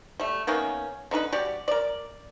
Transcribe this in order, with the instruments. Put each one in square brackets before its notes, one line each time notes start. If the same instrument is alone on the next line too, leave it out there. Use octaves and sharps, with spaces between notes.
[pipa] G3 A3
D#3 A#3 B3 C#4
D3 D#4 A#4 B4
G3 F#4 G4 D5
A#4 D5